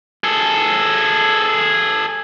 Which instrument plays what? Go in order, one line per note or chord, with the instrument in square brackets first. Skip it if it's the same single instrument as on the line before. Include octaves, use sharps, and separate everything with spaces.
[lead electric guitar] G#4 A4